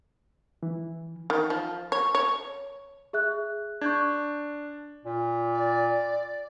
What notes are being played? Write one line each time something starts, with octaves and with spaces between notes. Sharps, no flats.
E3
D#3
F3
C#5
C#5
G#4 E5 F#6
D4 C#6 G6 G#6
A#2
D5